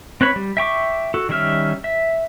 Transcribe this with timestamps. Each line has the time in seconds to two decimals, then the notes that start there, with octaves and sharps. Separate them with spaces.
0.21 C4 B4 C#5 B5
0.36 G3
0.57 E5 G5 C#6 D6
1.14 F#4 A4
1.29 D#3 G3 C#4 E5 F6
1.84 E5